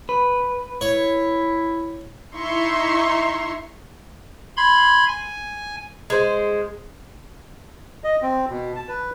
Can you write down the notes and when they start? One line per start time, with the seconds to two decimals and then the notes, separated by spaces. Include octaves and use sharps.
0.09 B4
0.81 E4 C#5
2.35 D#4 E4 E5 A#5 C6 C#6
4.57 B5 C6 G#6
5.08 G#5
6.10 G#3 C5
8.04 D#5
8.22 C4
8.49 B2
8.76 A5
8.88 B4